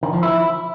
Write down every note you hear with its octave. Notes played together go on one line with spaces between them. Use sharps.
D#3
F3
E4